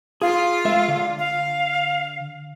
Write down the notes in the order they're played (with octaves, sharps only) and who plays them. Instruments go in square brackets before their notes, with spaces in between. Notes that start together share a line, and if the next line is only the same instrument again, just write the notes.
[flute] F4 [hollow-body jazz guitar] G#4
[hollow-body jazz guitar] G#3 A3 E5
D3
[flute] F5